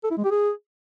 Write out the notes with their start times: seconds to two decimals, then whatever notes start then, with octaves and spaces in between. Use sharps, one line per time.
0.04 A4
0.11 E4
0.18 G#3
0.24 G4
0.31 G#4